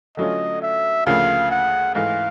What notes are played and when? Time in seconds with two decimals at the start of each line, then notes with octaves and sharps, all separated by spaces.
0.17 D3 F#3 A3 C#4 F4 D#5
0.62 E5
1.06 D2 C#3 F3 A#3 F5
1.51 F#5
1.95 G#2 E3 A3 F5